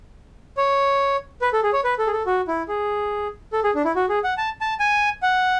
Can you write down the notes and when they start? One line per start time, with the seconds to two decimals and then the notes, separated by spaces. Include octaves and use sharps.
0.57 C#5
1.42 B4
1.53 A4
1.63 G#4
1.73 C#5
1.84 B4
1.99 A4
2.07 G#4
2.13 A4
2.26 F#4
2.48 E4
2.68 G#4
3.53 A4
3.64 G#4
3.75 D4
3.85 E4
3.96 F#4
4.09 G#4
4.24 F#5
4.38 A5
4.61 A5
4.80 G#5
5.23 F#5